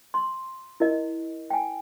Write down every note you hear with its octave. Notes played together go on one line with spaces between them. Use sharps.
C6
E4 A#4 D#5
G5 G#5